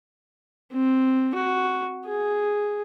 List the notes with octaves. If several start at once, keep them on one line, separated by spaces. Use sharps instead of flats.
C4
F#4
G#4